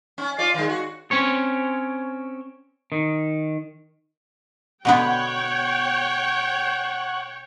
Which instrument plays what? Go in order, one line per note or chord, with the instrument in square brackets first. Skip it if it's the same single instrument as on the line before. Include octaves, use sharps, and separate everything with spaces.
[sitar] C#4
F4 D5
D#3 G#3
F#4
[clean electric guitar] C4 C#4 C#5
D#3
[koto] B2 D3 B3 [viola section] C#5 G5 [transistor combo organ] F#5 C#6